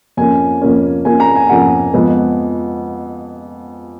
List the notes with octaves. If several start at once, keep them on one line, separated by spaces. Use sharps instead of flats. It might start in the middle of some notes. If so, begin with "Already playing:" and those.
F2 F3 A#3 C#4 G#5
F2 F3 A#3 C#4
F2 F3 A#3 C#4 G#5
A#5
G#5
F2 F3 A#3 C#4 F#5
F2 F3 G#3 B3